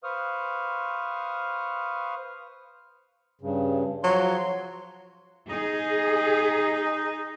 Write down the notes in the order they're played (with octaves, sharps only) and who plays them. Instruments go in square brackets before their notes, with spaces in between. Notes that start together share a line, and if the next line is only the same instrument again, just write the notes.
[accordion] B4 C5 F5 C#6 D#6 F6
G2 C#3
[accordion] F3 C6 [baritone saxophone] F#3
[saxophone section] D#4 [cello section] G#4